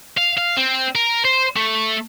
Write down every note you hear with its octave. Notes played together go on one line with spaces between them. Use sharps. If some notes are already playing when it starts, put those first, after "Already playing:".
F5
F5
C4
A#4
C5
A3